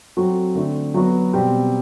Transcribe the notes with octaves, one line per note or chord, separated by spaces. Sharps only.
F#3 C4 F#4 A4
D3 A3 C4
F#3 B3 F#4
B2 G3 C4 G4